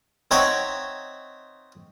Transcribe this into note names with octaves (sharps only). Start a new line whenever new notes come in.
C4 D#4 C#5 E5 F#5 G5